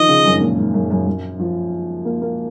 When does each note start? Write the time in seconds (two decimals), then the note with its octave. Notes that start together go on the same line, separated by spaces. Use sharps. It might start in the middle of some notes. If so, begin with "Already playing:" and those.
Already playing: D#3 F3 D#5
0.08 C#3
0.25 F#2
0.33 G#2
0.41 A#2
0.57 G#2
0.74 F#2
0.90 F#2
1.07 F#2
1.39 F3
2.05 A#3
2.22 A#3